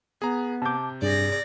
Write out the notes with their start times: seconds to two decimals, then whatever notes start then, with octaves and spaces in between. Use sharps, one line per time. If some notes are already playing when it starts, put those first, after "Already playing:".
0.22 B3 G#4 A#5
0.62 C3 A5 D6 G6
1.02 G2 G#4 D5 A#6